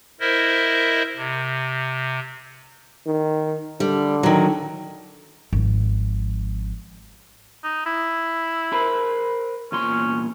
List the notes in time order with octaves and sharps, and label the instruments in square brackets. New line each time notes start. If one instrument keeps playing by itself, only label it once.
[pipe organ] E4 A#4 C5 D#5 E5
C3
[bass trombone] D#3
[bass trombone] D3 [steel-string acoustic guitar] G3
[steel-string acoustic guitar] D#3 F#3
[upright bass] G#1 F3
[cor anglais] D#4
E4
[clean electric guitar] A#4 C5 B5
[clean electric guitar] E2 A#2 C6 [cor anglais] C#4